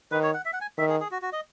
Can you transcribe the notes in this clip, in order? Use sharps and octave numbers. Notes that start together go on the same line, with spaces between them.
D#3 B4
C#5
F#5
E5
F#5
G#5
D#3 E5
G#4
G#4
F#4
F#4
D#5